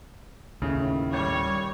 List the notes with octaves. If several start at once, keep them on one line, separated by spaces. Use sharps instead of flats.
D#2 A2 C#3
G3 C#5